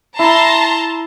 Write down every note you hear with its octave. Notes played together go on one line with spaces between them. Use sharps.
E4 A5 A#5 C6